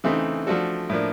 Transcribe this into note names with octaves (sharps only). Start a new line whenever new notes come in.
C#3 E3 A3 C4 D#4
F3 A3 D4 F#4 A4
A2 F3 A#3 D4